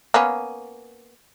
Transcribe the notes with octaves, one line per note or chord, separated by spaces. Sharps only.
A#3 B3 C#4